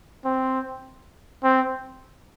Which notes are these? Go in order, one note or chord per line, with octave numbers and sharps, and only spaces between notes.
C4
C4